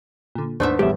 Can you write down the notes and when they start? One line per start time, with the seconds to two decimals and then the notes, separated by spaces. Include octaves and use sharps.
0.35 A#2 D3
0.60 D#2 G#2 A3 B3 D4 C5 E5
0.79 A1 E2 A2 F3 G3 G4 E5